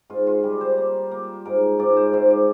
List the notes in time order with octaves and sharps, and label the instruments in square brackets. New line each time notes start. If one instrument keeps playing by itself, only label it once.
[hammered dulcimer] G#2 F4
F4
G3 G4
C5
A#3
A#3
G#2 A#4
G#2 D5
C5
G#2 C5
D5